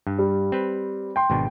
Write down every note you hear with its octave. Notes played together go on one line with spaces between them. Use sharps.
G2
G3
C4 B4
G5 C6
G#1 B2 D4